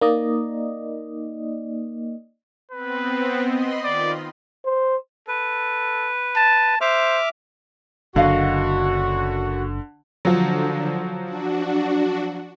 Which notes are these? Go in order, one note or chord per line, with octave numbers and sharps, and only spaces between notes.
A#3 D#4 D5 D#5
B3 C4 B4
D#5 B5 C6
D#3 F4 D5
C5
A4 B4
A5
C5 E5 D6 F6
F#1 F#2 D3 F#4 D#5 F5 F#5
D3 F3 F#3
D4 F#4